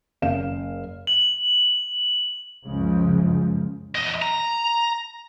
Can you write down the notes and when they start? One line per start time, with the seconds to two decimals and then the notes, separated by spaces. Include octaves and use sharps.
0.22 F#1 F5 E7
1.07 F#7
2.66 C#2 F#2 C#3 F3 G#3
3.95 E2 D#5
4.22 A#5